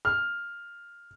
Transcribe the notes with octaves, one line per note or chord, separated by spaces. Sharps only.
F6